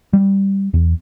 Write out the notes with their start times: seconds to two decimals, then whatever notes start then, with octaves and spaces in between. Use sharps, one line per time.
0.13 G3
0.74 E2